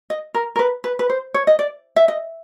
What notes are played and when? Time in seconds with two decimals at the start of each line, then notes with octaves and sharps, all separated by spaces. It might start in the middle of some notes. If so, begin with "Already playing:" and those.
0.10 D#5
0.34 A#4
0.56 A#4
0.59 B4
0.84 B4
0.99 B4
1.10 C5
1.34 C#5
1.47 D#5
1.59 D5
1.96 E5
2.08 D#5